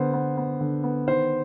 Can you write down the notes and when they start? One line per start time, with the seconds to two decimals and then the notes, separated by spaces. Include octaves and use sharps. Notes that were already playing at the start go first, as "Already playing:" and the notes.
Already playing: D3 B3 C5
0.13 B3
0.37 B3
0.60 D3
0.84 B3
1.08 D#3 C5